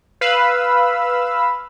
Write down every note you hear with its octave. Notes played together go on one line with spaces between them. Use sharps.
B4 F5 B5 E6